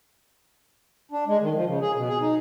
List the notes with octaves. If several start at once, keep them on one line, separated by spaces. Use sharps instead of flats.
D4
G#3
D#3
F3
C#3
G#4
B2
G#4
D#4